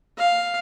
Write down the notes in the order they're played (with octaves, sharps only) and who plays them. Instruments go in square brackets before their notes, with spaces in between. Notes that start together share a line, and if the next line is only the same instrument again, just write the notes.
[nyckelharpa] F5